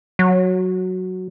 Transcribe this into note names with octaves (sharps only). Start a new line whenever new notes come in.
F#3